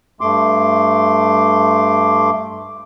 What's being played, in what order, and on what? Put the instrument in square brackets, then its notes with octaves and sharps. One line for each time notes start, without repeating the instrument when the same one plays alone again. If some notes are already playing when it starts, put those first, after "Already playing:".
[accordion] G2 A3 C6 D6